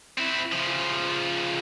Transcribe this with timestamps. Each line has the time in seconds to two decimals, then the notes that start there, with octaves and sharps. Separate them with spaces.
0.18 C4 E4
0.52 C#3 F3